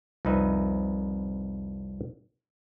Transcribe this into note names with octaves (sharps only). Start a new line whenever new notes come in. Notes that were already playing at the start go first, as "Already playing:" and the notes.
C2 F2 D#4 B4 E5